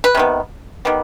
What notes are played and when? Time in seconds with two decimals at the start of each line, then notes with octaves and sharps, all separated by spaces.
0.04 B4
0.15 C3 D#3 B3
0.85 D#3 G3 B3